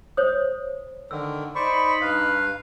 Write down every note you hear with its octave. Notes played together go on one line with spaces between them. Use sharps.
C5 C#5 D#6
D3 D#3 E6
D#4 C5 D5 B5 C#6
G2 B4 F5